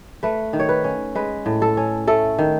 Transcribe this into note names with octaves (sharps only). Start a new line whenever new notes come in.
A3 B4
D#3
C#5
B4
C#4
G#3 B4
A2
A4
C#4
A3 A4
D#3